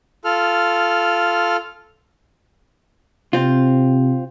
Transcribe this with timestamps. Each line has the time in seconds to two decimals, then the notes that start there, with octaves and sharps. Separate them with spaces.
0.24 F4 A4 F6
3.33 C3 C4 F4